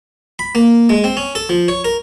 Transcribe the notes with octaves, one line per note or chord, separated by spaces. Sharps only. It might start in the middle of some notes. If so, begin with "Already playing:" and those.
B5
A#3
G#3
C4
C#4
A4
F3
C#5
A#4